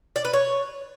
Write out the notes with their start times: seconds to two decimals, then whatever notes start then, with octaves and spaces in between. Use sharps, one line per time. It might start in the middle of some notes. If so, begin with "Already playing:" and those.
0.16 D5
0.25 B4
0.33 C#5